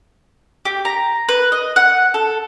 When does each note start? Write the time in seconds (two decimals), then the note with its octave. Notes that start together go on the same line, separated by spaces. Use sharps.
0.65 G4
0.85 A#5
1.29 B4
1.52 D#5
1.76 F#5
2.14 A4